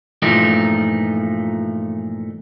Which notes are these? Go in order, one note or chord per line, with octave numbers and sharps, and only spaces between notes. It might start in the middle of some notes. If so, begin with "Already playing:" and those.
G2 A#2 E3 F3 A3 D#4